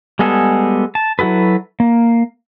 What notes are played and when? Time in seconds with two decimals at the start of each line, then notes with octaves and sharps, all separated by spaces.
0.19 G3 G#3 B3 G#4 A4
0.95 A5
1.19 F#3 E4 F#4 A4 B4
1.80 A#3